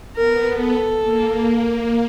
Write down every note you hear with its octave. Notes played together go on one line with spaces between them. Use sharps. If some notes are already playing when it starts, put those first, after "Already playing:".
B3 A#4
A4
A#3